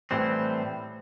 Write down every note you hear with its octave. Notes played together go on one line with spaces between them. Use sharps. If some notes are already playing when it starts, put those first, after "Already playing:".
A2 E3 G3 C4